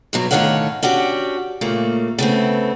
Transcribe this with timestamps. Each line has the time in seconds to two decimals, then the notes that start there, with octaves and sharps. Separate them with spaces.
0.13 G2 B2 F#3
0.31 A2 D3 D#3 C#5 F5 F#5
0.83 C#4 D4 F#4 G4
1.61 A#2 C#3 A3 A#3
2.19 C#3 A3 B3 C4